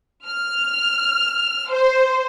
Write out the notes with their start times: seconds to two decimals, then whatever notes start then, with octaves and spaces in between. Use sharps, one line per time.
0.25 F6
1.70 C5